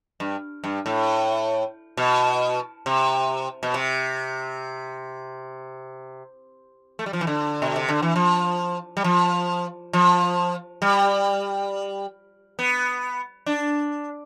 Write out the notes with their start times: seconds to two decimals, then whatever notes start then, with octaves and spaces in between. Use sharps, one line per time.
0.20 G2
0.64 G2
0.86 A2
1.97 B2
2.86 C3
3.63 B2
3.74 C3
6.99 A3
7.06 G3
7.13 F3
7.21 E3
7.27 D3
7.62 B2
7.76 C3
7.89 D3
8.02 E3
8.16 F3
8.97 G3
9.04 F3
9.93 F3
10.82 G3
12.59 B3
13.46 D4